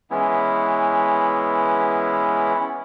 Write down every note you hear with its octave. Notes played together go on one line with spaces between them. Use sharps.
E3 G#3 B3 C#4 E4